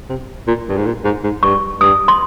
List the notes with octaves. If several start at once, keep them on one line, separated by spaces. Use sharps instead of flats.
C3
A#2
G2
G#2
A#2
G#2
G#2
G2 C#6
G2 D#6
C6